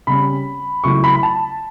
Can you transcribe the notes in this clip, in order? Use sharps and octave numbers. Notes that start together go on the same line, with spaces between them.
C#3 G3 C#4 B5
C#2 C#3 F#3 A3 E4 C#6
B5
B5
A5